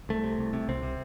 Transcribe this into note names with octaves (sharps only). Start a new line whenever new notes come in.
C2 A3
C3
C2
C3
C2 C4
C3